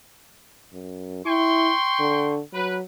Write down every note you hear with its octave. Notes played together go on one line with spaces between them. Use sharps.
F#2
E4 G5 C6 C#6
D3
F#3 B4